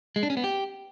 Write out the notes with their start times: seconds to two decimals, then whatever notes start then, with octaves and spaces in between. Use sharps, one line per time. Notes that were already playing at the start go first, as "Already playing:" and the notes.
0.16 G#3
0.23 D4
0.30 C#4
0.37 B3
0.44 G4